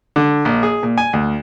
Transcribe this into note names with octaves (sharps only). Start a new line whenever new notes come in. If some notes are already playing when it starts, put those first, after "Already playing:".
D3
A#1
G#4
A#2
G#5
D2